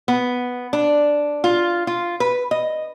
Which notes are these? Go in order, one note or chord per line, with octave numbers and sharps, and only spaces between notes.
B3
D4
F4
F4
B4
D#5